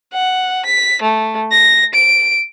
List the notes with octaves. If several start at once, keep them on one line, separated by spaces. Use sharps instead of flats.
F#5
B6
A3
A#6
D7